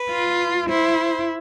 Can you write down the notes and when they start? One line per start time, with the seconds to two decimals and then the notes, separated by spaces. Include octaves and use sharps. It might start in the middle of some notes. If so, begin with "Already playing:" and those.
Already playing: B4
0.10 F4
0.69 E4 C5